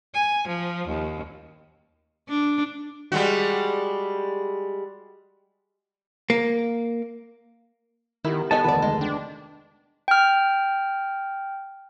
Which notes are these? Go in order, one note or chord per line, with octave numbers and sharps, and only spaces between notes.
G#5
F3
D#2
D4
G3 G#3 F#4
A#3
D#3 B3 E4 G4 A#4
B3 D#4 G4 A4 C#5 D#5 G#5 A5
F1 D2 D#3 B4 D5
G#3
D4 G5
G5 F6